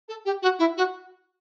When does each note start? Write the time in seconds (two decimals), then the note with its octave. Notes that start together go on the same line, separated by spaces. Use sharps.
0.09 A4
0.25 G4
0.42 F#4
0.59 E4
0.77 F#4